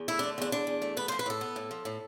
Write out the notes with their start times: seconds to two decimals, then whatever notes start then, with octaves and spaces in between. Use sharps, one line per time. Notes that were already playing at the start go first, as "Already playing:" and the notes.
Already playing: E2
0.08 A3 E4
0.19 D3 D4
0.38 E2 D4
0.52 E2 D4
0.67 E2
0.82 A3
0.97 B3 B4
1.08 F3 C5
1.19 B4
1.26 A2 A4
1.41 B3
1.56 A2
1.71 F3
1.85 A2